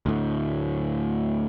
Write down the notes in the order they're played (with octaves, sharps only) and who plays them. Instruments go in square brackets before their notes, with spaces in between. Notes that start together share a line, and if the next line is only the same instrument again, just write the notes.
[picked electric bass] D2 A2